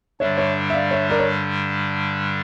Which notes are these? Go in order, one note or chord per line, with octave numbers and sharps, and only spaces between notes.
G2 D3 G3 D4 C#5 E5
C#5 E5
E5
D5 F5
C#5 E5
A#4 D5
C#5